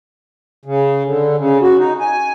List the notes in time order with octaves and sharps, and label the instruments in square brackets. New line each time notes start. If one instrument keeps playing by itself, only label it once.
[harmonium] C#3
D3
C#3
F#4
D#4
G#5